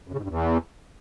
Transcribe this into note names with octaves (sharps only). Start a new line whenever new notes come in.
F#2
C#3
G#2
G2
E2